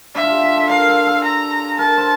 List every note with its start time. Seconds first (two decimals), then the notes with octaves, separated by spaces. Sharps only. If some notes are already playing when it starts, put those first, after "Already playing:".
0.15 D4 E5
0.23 F4
0.29 G4
0.43 A4
0.57 A4
0.70 A#4 F5
0.89 A4
1.06 A4
1.24 A#5
1.79 A#4 A5
1.97 C5